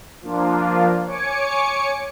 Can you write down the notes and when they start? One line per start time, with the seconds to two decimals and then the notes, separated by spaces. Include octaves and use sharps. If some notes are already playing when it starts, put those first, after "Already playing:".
0.22 F3 A#3 D4 F4
1.06 C#5 G#5 D6 C#7